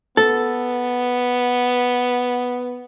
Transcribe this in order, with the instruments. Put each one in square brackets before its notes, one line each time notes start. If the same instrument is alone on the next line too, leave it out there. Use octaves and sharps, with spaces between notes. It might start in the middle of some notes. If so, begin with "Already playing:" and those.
[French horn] B3 [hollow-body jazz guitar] A4